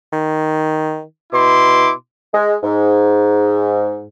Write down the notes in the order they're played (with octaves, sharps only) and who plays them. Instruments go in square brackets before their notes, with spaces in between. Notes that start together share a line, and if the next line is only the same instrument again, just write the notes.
[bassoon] D#3
[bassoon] B2 [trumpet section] E4 C6 D6
[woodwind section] G#3
G#2